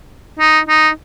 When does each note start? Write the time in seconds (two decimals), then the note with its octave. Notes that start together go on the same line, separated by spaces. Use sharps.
0.40 D#4
0.69 D#4